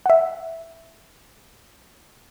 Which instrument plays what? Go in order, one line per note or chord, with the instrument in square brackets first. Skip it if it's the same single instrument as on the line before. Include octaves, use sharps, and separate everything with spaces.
[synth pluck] E5 F#5